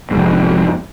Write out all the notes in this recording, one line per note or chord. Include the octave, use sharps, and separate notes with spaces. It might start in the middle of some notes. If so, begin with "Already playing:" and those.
F1 G#2